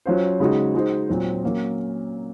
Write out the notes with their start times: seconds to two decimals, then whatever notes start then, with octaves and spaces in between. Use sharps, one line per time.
0.06 F#3 C#4 F4 C5
0.40 C#3 G#3 D#4 F#4
0.74 G#3 D#4 F#4 C5
1.09 A#2 F#3 C4
1.43 F#3 A#3 C#4